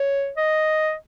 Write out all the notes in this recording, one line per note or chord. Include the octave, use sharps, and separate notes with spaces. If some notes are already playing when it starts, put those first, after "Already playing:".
Already playing: C#5
D#5